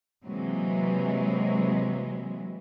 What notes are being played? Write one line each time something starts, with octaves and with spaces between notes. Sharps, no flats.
C3 E3 F#3 G#3 A#3